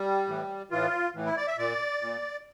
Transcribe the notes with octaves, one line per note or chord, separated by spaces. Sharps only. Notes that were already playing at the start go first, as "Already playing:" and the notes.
Already playing: G3
A2 E3
A2 E3 F4
A2 E3
E4
D5
E5
A#2 D5
A#2